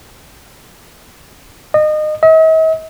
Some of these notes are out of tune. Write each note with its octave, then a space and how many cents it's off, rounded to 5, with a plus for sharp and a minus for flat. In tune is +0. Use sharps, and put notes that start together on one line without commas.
D#5 -30
D#5 +45